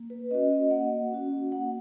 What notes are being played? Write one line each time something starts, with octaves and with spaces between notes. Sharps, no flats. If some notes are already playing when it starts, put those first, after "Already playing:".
Already playing: A#3
B4
C#4 F#4 D#5
D#5
A#3 F#5
C#4 F#4
A#3 F#5